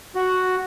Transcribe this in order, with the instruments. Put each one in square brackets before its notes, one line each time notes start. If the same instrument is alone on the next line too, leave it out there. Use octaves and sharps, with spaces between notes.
[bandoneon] F#4